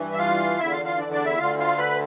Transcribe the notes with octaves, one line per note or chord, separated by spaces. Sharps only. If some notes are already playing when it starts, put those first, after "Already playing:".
Already playing: G2 E3
E5
F4 F5
E2 D3 E4 E5
F4 F5
F4 F5
D4 D5
D4 D5
E4 E5
D2 D3 F4 F5
F4 F5
B4 B5